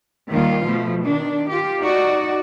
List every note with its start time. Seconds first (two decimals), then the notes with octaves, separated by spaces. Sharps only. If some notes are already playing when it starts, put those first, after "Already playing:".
0.30 D#2 D#3 G3 F4
0.67 B2 F3 A3
1.04 D#3 D4
1.49 F4 G4
1.81 D#4 F#4 D5